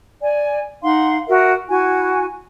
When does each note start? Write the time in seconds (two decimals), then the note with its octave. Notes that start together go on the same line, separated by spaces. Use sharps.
0.21 D5 G#5
0.83 D#4 F5 F#5 C6
1.28 F#4 A#4 E5
1.69 E4 F#4 G#5